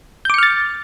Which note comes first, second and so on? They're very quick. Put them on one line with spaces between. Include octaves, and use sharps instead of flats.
G6 D6 C#7 F6 A6